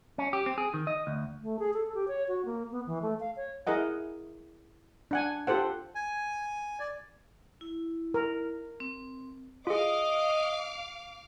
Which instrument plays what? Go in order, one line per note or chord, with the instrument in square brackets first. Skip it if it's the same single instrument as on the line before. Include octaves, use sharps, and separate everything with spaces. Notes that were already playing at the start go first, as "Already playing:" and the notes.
[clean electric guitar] C#4
G4
C4
G#4
D#3
D#5
D2
[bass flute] A3
G#4
A4
G4
C#5
F#4
A#3
B3
E3
A3
F5
C#5
[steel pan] E4 G#4 A#4 D#5 F#5
D4 F#5 G#5
F4 G4 A4 C5 F#5
[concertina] G#5
D5
[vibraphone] E4
[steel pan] A#4
[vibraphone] C4
[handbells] F4 G#4 [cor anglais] D#5 [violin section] F5 D6